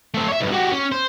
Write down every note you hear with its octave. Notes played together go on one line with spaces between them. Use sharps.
A3 C4
C#5 E5
B1 G2
F#4 G4
C#4
C5